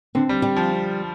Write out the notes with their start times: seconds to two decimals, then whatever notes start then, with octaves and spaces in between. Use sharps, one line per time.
0.15 D3 C4
0.29 G3
0.42 G3
0.56 F3